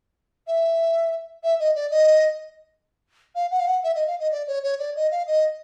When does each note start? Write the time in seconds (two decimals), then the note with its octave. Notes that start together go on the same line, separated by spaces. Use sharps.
0.47 E5
1.43 E5
1.59 D#5
1.75 D5
1.90 D#5
3.35 F5
3.51 F#5
3.59 F5
3.67 F#5
3.83 E5
3.95 D#5
4.07 F5
4.19 D#5
4.31 D5
4.47 C#5
4.63 C#5
4.79 D5
4.95 D#5
5.11 F5
5.27 D#5